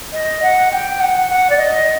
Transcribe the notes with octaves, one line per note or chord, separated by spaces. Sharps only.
D#5
F#5
G5
F#5
F#5
D5
D#5